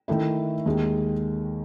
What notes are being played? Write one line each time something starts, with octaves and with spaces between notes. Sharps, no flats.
D#3 A3 E4
D#2 D#3 G#3